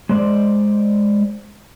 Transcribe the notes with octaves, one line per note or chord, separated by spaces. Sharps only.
G#3 C5 D5